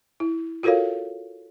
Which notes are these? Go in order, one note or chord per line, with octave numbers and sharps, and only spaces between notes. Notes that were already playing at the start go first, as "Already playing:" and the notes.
E4
F4 F#4 A4 A#4 C#5 F5